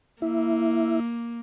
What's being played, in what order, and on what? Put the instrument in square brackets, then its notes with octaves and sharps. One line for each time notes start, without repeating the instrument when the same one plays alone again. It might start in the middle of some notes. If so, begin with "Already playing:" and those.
[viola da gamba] A#3 [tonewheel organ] E4